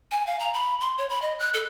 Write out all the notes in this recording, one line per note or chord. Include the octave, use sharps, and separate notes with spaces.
G#5
F5
A#5
B5
C6
C#5
B5
D#5
F#6
A4